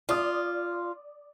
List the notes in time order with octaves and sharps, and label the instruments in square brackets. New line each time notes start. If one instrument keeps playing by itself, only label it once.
[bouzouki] F4 [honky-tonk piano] D5 D#6